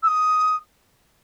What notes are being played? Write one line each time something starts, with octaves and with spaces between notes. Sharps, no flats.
E6
D#6